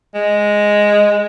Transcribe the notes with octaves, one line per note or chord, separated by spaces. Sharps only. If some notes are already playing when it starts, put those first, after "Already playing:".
G#3